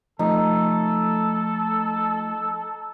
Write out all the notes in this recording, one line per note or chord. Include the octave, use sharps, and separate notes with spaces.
F3 A3 D#4 A4